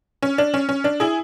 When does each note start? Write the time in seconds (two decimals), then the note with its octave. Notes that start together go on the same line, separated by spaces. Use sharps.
0.22 C#4
0.38 D4
0.54 C#4
0.69 C#4
0.84 D4
1.00 E4 G#4